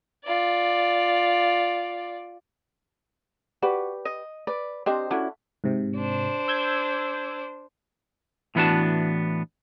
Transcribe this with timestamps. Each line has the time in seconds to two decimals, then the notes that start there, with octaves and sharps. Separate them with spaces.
0.25 F4 D5
3.62 F#4 G4 B4 D5
4.05 D#5
4.47 B4 D5
4.86 C4 D4 G4 C5 D#5
5.11 A3 C#4 D4 E4 F#4
5.64 G#2 C3
5.97 D4 C5
6.48 E6 G6 G#6
8.55 A2 E3 B3 D4 F#4 A5